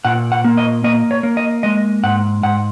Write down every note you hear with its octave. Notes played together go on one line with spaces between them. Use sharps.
A#2 F#5
F#5
A#3
D#5
A#3 D#5
C#5
A#3
D#5
G#3 D#5
G#2 F#5
G#2 F#5